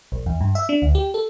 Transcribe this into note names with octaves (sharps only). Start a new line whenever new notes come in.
A#1
E2
G2
E5
D4
D2
G4
A4